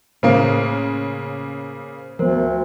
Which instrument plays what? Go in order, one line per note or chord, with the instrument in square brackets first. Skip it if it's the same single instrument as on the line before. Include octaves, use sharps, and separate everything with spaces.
[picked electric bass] A2 [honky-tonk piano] C#3 A#3 [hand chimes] C5
[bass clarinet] D2 [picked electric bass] F3 B3 [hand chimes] A#4 C5